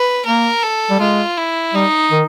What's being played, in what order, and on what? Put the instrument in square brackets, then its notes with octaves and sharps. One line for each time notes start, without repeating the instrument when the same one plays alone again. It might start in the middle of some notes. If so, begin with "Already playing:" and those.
Already playing: [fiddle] B4
[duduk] A#3 [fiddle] A#4
[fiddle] A4
[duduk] G3
[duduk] G#3 [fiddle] F4
[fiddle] E4
[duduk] G3 [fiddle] D#4
[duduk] D#3